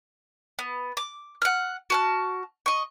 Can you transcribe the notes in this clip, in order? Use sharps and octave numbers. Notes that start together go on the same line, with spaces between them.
B3
D6
F#5 F6
F#4 A5 F6
D#5 C#6